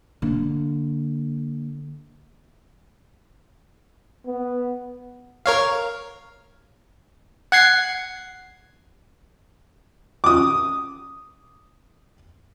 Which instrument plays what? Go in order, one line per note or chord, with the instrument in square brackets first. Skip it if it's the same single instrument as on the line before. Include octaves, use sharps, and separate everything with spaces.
[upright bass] D3 A#3
[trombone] B3
[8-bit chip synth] A#4 C#5 F5
F#5 G#6 C7
[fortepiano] D6 D#6